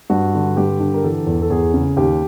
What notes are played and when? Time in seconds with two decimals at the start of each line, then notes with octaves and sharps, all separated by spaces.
0.10 G2 F#4
0.34 D3
0.57 G2 G4
0.80 D3
0.94 A#4
1.04 E3 A4
1.27 E2
1.42 A4
1.50 E2 G#4
1.74 C#3
1.97 D#2 G4